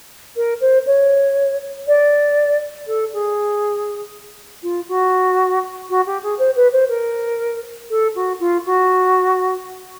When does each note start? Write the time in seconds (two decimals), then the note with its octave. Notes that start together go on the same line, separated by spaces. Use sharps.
0.36 A#4
0.61 C5
0.86 C#5
1.87 D5
2.87 A4
3.13 G#4
4.63 F4
4.88 F#4
5.89 F#4
6.06 G4
6.23 G#4
6.39 C5
6.56 B4
6.72 C5
6.88 A#4
7.90 A4
8.15 F#4
8.40 F4
8.65 F#4